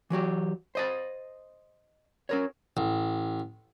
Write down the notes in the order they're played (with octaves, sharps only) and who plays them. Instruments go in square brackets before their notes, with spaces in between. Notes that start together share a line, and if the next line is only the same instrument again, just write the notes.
[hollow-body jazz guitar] E3 F#3 F#4 G4
C5 D#5 A5
C#4 A#4 C#5
[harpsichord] A1